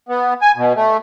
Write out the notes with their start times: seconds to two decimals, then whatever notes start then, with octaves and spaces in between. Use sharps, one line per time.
0.09 B3
0.42 G#5
0.56 B2
0.75 A3